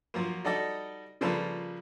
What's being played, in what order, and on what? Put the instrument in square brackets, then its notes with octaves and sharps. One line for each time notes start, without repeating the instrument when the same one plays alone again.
[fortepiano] F3 F#3 A#3
G3 D#4 F#4 A4 D5 D#5
C#3 F3 G3 A#3 A4 B4